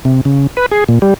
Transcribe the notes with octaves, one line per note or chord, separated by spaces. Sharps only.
C3
C#3
B4
G#4
A#2
G3